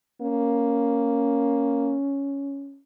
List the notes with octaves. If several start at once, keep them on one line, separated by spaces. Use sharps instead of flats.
A#3 C#4